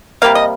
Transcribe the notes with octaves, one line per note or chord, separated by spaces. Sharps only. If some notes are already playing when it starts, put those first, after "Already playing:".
C3 G3 A#3 F5
D#5